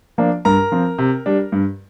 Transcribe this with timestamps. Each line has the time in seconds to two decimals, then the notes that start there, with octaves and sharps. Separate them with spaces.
0.18 F3 A#3 D4
0.45 G2 A#4 A#5
0.72 F3 C4
0.98 C3
1.26 G3 D4
1.52 G2